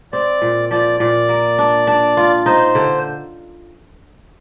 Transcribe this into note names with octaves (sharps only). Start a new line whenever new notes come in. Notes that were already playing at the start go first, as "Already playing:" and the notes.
C4 D5
A#2
F3 D5
A#2 D5
A#3
D4
D4
F4
D#4 C5
D3